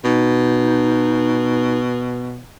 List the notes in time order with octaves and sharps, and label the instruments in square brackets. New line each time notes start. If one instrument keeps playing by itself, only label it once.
[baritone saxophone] B2 [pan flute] D#4